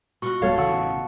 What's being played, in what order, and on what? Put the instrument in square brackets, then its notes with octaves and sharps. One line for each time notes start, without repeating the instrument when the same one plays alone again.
[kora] B2 F4 F#4 [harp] C#6
[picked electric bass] D1 G3 B3 [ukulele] A4 C#5 [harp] F5 A5 F6
[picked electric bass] A1 C#3 E3 [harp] F#5 C#6 E6